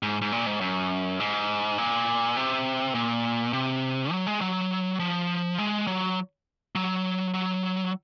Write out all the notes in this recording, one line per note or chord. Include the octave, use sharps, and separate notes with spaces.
G#2
G#2
A#2
G#2
F#2
G#2
A#2
C3
A#2
C3
F#3
G#3
F#3
F3
G#3
F#3
F#3
F#3